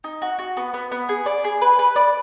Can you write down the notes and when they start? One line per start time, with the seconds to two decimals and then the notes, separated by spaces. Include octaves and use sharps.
0.04 D#4
0.22 F#4
0.39 F#4
0.57 B3
0.74 B3
0.92 B3
1.09 G#4
1.26 D5
1.44 G#4
1.62 B4
1.79 B4
1.96 D5